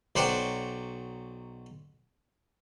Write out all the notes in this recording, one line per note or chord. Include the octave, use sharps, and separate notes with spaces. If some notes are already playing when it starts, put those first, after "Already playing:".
B1 F#3 C5 D5 F#5 G5